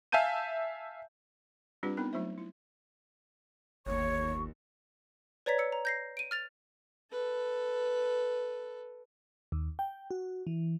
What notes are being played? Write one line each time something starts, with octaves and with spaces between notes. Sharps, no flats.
E5 F5 G#5 A5 G6 D#7
G3 C4 D4 F4 G4 B4
B3 C4 D#4 A#4 B5
F#3 A3 D#4 F4 C5 E5
E4
G1 D#2 C#5 C#6
B4 C#5 D5 A#5 G#6 B6
E6 C#7
A#5
G6 A#6 C7
D7 D#7
F6 A6 F7
A4 B4
D#2
G5
F#4
E3